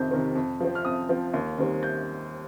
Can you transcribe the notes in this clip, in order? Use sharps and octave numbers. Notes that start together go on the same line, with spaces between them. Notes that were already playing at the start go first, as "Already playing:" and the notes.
Already playing: F2 C3 D#3 C4 G6
C3 D#3 C4
F2
F3 C4
F6
F2 D#6
F3 C4
D#2
D#3 G3 C4
G6